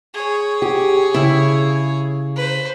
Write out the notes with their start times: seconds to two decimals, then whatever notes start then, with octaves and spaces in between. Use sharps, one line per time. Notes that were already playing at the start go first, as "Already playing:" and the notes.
0.14 G#4 C#5
0.62 G4
1.14 C#3 E4
2.36 B4 C5